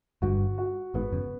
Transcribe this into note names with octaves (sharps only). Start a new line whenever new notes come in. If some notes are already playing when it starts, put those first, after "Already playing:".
G1 G2 F#4
F#4
G#1 G#2 B3
F#1 F#2